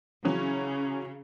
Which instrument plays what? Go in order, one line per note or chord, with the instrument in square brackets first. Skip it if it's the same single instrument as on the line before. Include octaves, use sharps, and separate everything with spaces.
[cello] C#3 [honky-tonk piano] E3 F#3 C#4